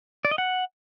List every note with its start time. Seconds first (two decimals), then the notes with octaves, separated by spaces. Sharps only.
0.25 D5
0.31 D#5
0.38 F#5